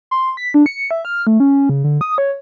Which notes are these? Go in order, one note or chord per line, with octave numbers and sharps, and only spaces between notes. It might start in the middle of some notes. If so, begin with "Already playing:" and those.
C6
B6
D4
C#7
E5
F6
A3
C#4
C#3
D3
D#6
C#5